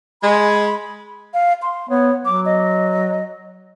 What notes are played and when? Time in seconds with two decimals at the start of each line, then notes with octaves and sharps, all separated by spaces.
0.22 G#3 B5
1.34 F5
1.62 C6
1.90 B3 C#5
2.25 F#3 D6
2.45 D#5